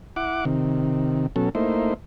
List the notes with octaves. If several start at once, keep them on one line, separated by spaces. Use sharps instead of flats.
E4 F#5 D6
C3 D#3
B2 F#3 C#4 A4
A3 A#3 D#4 E4 C5